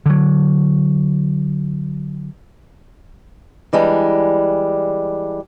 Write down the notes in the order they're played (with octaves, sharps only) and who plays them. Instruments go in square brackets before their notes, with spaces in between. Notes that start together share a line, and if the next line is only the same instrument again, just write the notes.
[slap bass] D3 F#3
[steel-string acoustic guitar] E3 G3 G#3 D4